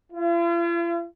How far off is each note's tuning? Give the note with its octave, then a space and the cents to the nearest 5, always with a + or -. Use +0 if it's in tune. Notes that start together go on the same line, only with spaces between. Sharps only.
F4 -45